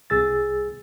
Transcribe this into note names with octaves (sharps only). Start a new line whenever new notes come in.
C2 G#4 E6 A6